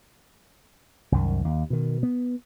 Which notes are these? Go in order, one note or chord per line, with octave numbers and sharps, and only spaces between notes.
C2 F#2 D#3
D#2
B2 D#3
B3